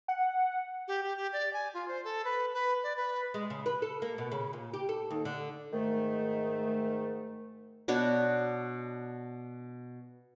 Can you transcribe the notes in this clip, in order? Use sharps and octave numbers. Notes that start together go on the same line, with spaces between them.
F#5
G4
G4
G4
D5
G#5
F4
C5
A4
B4
B4
D5
B4
G#3
C#3
B4
A4
A#3
B2
C#3
A#2
G4
A4
D#2
D3
G#2 D#3 A3
B2 D4 F#4 C#5